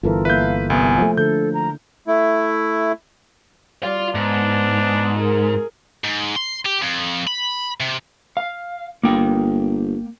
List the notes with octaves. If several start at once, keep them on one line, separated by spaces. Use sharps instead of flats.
G1 E3 F4 A4 A#4
A#3 E4 B4 E5 F5 G6
C2 B3 G#5
F3 A3
D3 A4 G6
A#5
A3 E4
G3 F4 D5 F5
G#2 B3 D4
G#4 A#4
G#2
C6
G4
F2
B5
C3
F5
G1 A#3 G5